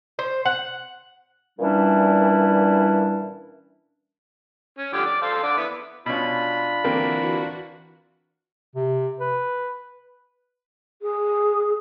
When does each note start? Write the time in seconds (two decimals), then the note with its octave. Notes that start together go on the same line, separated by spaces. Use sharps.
0.19 C5
0.45 F#5
1.59 A#2 E3 G3 C#4 D4 E4
4.77 C#4
4.93 D3 F3 G4
5.06 D5
5.22 A4 C5 F5
5.43 D3 D5
5.57 B3 E4
6.06 B2 C#4 D4 F4 B5
6.84 D3 E3 A#3 C4 F#4
8.75 C3
9.20 B4
11.01 G#4